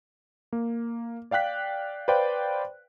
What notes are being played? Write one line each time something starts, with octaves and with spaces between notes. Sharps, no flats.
A#3
D5 F5 G5 F#6 B6
B4 C5 D5 F5 G5